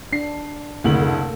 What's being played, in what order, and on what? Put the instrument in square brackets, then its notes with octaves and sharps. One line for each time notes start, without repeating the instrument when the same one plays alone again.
[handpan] D4 [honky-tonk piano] C7
[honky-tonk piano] F#1 D2 F#7 [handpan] C3 A3 A#3
[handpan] A4